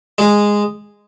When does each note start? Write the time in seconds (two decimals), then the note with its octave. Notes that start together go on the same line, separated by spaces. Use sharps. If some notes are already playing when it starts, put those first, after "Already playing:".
0.18 G#3